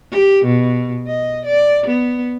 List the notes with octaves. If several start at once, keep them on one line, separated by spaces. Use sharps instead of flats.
G4
B2
D#5
D5
B3